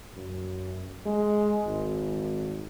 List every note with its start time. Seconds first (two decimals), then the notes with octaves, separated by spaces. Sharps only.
0.16 F#2
1.06 G#3
1.66 G#1